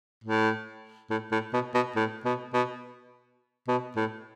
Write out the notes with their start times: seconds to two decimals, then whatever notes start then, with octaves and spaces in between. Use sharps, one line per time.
0.24 A2
1.10 A2
1.31 A2
1.53 B2
1.74 B2
1.96 A2
2.25 B2
2.53 B2
3.68 B2
3.96 A2